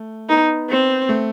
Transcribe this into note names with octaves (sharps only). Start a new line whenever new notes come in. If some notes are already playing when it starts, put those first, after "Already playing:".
Already playing: A3
B3 D#4
C4
A3